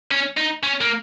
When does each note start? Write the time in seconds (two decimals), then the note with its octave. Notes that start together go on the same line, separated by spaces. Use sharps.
0.11 C#4
0.37 D#4
0.63 C#4
0.81 A#3